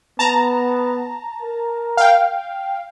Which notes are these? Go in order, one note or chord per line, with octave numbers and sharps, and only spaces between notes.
B3 A5 A#5
A#4
F5 G5